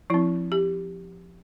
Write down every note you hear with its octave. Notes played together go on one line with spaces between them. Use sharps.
F3 C4 E4
G4